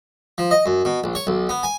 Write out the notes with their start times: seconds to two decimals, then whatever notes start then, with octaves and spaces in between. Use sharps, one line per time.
0.38 F3
0.51 D#5
0.66 F#2
0.85 B2
1.04 A#1
1.15 C#5
1.27 B1
1.49 B3
1.63 G#5